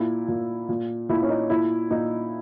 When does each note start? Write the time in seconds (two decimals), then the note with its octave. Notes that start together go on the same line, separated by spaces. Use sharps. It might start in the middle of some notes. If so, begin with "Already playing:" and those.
Already playing: A#2 E4
0.28 A#2
0.69 A#2
1.09 A#2 E4
1.23 C#4
1.29 D#4
1.50 A#2 E4
1.91 A#2 D#4